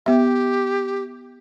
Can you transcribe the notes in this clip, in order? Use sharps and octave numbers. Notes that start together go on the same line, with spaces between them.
B3 G4 E5